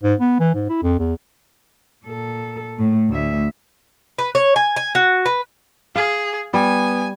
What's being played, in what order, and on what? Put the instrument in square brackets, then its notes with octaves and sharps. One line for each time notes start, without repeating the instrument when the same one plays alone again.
[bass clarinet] G#2
B3
E3
G#2
E4
F2
E2
[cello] A#2 A4
A2 A3
D2 E5
[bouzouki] B4
C#5
G#5
G#5
F#4
B4
[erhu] G#4 [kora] F5
[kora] G3 [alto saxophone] B3 [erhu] G#5